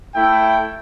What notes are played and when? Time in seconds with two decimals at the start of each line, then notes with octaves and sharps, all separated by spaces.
0.15 A3 E4 G5